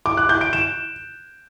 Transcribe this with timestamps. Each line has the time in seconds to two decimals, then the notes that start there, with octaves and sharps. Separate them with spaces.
0.06 D6
0.17 F#6
0.29 G6
0.41 D7
0.53 E7